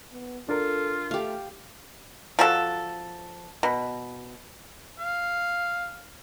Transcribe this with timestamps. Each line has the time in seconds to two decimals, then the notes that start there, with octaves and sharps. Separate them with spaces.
0.12 B3
0.49 D4 F4 A4 A#4
1.11 A3 G4 F5
2.39 F3 F#4 A4
3.63 B2
4.99 F5